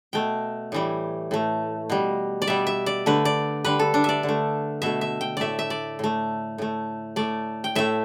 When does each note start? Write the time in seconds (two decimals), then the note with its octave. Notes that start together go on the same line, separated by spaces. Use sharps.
0.13 B2 A3 G5
0.72 A2 E3 G3
1.31 A2 A3
1.90 B2 G3
2.42 D5
2.47 B2 G3 E5
2.67 E5
2.86 D5
3.06 D3 A3 B4
3.25 D5
3.64 D3 G3 B4
3.79 A4
3.94 D4
4.04 D5 E5
4.23 D3
4.29 A3
4.82 B2 A3 E5
5.01 E5
5.21 G5
5.37 A2 A3 D5 E5
5.59 E5
5.70 D5
5.99 A2 A3
6.58 A2 A3
7.16 A2 A3 D5
7.64 G5
7.75 A2 A3 E5